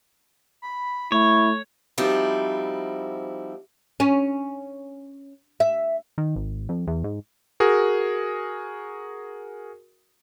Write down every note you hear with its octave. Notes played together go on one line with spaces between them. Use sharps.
B5
A3 E4 C#5
F3 G3 C4 D#4 E4 F#4
C#4
E5
D#3
G#1
F2
E2
G#2
F#4 G#4 A#4